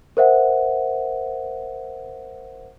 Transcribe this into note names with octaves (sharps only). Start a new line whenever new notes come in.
A#4 C5 E5 F#5